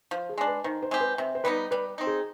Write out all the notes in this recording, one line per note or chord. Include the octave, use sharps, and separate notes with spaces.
F3
G#4
G#3 D4
B4
D#3 C5
C5
G#3 C4 G4
B4
C3
C5
G3 B3 D#4 B4
G3 B4
C4 D#4
G#4